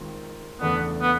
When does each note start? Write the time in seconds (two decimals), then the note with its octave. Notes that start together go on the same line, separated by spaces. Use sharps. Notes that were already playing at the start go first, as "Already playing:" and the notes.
Already playing: D#3 G#3 C4 F4 A#4
0.61 E2 C#3 E3 A3 B3 D4
1.02 B3